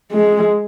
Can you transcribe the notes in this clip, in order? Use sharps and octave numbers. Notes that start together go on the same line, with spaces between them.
G#3